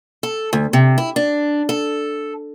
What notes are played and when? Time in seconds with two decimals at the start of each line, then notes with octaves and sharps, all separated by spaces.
0.23 A4
0.53 D2
0.73 C3
0.98 E4
1.16 D4
1.69 A4